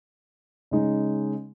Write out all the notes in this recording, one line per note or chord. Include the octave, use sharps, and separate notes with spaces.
C#3 G#3 D#4